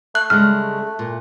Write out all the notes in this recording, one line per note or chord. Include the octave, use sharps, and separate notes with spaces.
A3 F#6
C#3 G3 G#3 F6
A#2